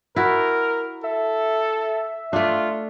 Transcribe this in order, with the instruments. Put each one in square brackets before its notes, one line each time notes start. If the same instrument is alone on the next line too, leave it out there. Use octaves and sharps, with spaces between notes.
[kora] E4 F#4 [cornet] A#4
[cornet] A4 [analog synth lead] E5
[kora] A3 D4 [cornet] F4